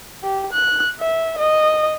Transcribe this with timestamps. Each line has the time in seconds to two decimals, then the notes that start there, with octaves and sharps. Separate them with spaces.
0.23 G4
0.53 F#6
1.00 E5
1.38 D#5